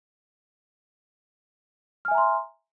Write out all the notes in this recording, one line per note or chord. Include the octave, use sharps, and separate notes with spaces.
E5 G#5 A#5 C6 F6